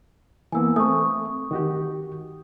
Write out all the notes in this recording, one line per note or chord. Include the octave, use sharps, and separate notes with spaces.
E3 A#3 B3 G#5 E6
A3 C4 C#6 D#6
D#3 F#4 G4